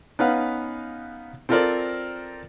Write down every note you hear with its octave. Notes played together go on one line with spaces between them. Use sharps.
B3 C#4 D#4 B4 F5 F#5
C4 F4 A4 A#4 C5 D5